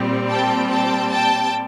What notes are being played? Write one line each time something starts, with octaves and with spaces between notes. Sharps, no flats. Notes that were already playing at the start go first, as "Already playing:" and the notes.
Already playing: A#2 G3 C4
G5 A5
G5 A5
G5 A5